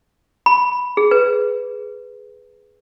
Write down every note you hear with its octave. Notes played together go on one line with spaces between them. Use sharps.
B5
G#4
B4